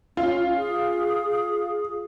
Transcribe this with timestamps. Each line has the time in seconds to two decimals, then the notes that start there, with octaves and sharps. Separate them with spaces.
0.17 C#4 F4
0.57 G#4